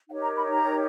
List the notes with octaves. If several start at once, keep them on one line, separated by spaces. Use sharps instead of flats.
D#4 G4 A#4 C#5 F#5
A#5
B5
A#5